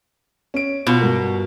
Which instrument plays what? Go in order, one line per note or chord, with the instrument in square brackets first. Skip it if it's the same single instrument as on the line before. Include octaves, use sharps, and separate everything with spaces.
[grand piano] C#4 D7
[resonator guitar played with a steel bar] B2 [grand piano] B3 F4
[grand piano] G2 F#4 A#4